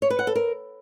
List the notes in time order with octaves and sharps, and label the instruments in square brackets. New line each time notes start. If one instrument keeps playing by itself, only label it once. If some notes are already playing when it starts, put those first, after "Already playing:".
[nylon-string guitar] C#5
B4
F#5
A4
A#4